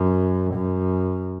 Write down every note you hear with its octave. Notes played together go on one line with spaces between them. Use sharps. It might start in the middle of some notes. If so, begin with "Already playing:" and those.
Already playing: F#2
F#2